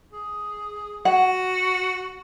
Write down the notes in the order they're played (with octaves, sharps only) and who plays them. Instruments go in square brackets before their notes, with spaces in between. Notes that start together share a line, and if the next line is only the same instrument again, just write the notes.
[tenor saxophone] G#4
[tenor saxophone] F#4 [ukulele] F#5